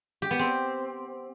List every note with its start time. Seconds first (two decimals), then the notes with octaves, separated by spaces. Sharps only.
0.22 G4
0.31 B3
0.39 C4